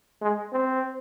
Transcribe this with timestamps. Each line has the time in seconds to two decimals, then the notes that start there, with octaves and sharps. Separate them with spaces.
0.22 G#3
0.52 C4